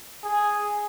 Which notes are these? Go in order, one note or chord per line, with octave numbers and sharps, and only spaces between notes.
G#4